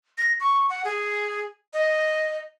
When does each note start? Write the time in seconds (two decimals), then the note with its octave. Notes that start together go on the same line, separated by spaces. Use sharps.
0.18 A#6
0.40 C#6
0.69 F#5
0.85 G#4
1.73 D#5